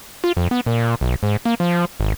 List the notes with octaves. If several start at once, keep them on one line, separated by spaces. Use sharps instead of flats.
F4
F2
B3
A#2
B1
G#2
A#3
F3
G#1